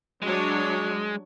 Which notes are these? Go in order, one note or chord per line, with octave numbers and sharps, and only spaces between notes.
F#3 G#3 D4 C#5